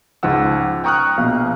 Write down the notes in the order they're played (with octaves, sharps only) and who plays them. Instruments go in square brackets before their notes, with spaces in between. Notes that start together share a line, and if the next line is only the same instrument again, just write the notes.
[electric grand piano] C#2 G#2 F3 F#5 E6
G5 A#5 C#6 D#6 F6 F#6
A#1 B2 F5